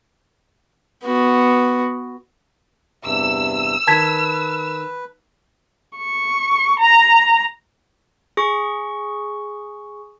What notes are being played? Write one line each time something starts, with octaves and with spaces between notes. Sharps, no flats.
B3 F#4
E2 G2 C3 E6
D#3 B4 A5 G#6 B6
C#6
A#5
G#4 C#6